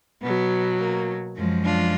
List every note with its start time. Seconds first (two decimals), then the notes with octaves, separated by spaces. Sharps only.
0.22 B2 F#3 B3
0.79 A#3
1.36 F#2 F3 G#3
1.64 D4 F4